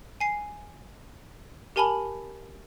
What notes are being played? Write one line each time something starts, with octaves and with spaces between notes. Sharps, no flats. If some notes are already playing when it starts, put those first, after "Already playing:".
G#5 C7
G4 A#4 G#5 A5 B5 F#7